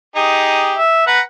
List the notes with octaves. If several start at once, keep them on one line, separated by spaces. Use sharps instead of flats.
D#4 G4 G#4
E5
B4 F#5 A#5